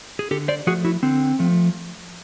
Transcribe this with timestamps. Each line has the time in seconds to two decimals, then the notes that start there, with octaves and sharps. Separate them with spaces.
0.19 G#4
0.31 D3 G4 A4
0.48 C5 D5
0.67 F3 A3 F#4 G#4
0.85 E4 F#4
1.03 D3 C4
1.39 F3 A3